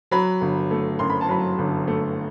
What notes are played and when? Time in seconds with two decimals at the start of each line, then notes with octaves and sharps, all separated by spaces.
0.11 F#3 B5
0.41 G1
0.71 A3
0.99 F#2 C6
1.10 B5
1.21 A5
1.28 F#3 B5
1.58 G1
1.88 A3